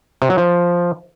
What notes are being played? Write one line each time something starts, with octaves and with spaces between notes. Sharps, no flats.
C3
F#3
F3